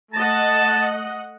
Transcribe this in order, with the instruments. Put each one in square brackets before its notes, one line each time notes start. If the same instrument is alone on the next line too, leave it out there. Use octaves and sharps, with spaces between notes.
[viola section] A3 D#5 F#5 [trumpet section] A5